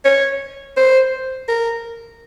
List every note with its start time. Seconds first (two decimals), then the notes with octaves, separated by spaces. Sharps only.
0.05 C#5
0.77 C5
1.48 A#4